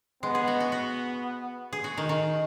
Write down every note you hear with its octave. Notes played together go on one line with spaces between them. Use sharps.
G#3 B3
G#4
F#4
F#4
F#4
G#4
F#4
D#3
D#3